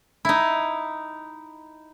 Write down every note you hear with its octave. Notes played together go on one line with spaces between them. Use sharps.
D#4 E4